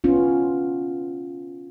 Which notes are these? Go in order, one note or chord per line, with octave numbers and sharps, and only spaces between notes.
B3 C#4 F4